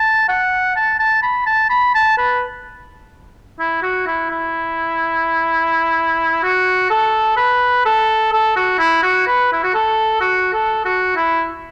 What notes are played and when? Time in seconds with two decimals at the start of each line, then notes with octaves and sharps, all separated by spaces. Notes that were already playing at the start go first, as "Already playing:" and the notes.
Already playing: A5
0.29 F#5
0.76 A5
1.00 A5
1.23 B5
1.46 A5
1.70 B5
1.94 A5
2.18 B4
3.59 E4
3.82 F#4
4.07 E4
4.30 E4
6.43 F#4
6.90 A4
7.37 B4
7.85 A4
8.32 A4
8.56 F#4
8.79 E4
9.03 F#4
9.27 B4
9.53 E4
9.64 F#4
9.74 A4
10.21 F#4
10.53 A4
10.85 F#4
11.16 E4